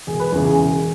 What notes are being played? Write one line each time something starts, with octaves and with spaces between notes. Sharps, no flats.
E1 G#4
B4
E2 C#3 E3 G#4
G#4
E1